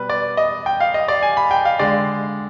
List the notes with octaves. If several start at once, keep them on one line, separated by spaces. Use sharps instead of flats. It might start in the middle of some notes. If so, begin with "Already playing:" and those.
Already playing: B2 G3 B4
D5
D#5
G5
F5
D#5
D5
G#5
B5
G5
F5
D3 G#3 D5